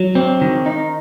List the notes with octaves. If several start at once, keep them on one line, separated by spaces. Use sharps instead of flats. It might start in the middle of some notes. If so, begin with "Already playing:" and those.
Already playing: F#3
C4
D#3
D#4